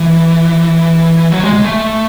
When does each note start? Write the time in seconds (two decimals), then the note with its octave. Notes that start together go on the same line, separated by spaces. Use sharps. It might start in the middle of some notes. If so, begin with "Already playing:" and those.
Already playing: E3
1.32 F#3
1.43 G#3
1.54 G#3
1.64 A3